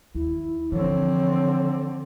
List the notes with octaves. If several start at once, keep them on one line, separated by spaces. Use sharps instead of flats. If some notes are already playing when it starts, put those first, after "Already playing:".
D#2 E4
D3 E3 F3 C4 C#5